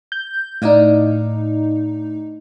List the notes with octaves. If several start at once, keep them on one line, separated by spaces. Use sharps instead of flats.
G6
A2 D4 D#4 D#5 F5